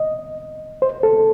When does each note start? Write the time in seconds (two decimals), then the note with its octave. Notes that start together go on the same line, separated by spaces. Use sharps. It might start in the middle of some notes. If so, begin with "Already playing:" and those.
Already playing: D#5
0.82 C5
1.03 A4